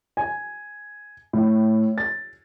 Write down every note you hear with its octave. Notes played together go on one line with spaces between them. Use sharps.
G#5
A2
A6